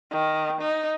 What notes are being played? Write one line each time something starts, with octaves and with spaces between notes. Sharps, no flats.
D#3
D#4